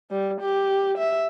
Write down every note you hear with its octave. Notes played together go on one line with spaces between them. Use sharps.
G3
G4
E5